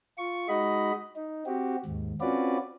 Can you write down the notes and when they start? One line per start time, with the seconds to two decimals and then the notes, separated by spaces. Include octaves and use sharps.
0.18 F4 C#6
0.49 G#3 D#4 F#4 D#5 B5
1.16 D#4
1.46 C4 F#4 G4
1.86 D#2 G#2
2.21 C4 C#4 F4 F#4 B4 D5